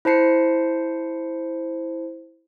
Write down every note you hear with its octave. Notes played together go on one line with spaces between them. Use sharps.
E4 C5 A5 C7 C#7